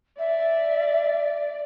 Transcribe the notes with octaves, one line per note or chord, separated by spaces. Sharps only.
D5 E5